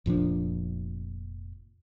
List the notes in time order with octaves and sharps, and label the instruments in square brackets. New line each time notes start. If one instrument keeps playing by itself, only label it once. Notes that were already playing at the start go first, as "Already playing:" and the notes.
[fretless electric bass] F1 A#2 F3 D4